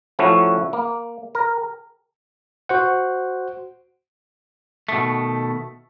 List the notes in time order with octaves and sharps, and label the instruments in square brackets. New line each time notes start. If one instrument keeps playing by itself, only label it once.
[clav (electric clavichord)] F3 A3 C#4 E4 F#4
A#3
A#4
[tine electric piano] F#4 C5 F#5
[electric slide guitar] B2 D#3 A3